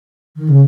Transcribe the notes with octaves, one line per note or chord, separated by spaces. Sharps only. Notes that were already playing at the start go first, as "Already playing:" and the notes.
D#3
C#3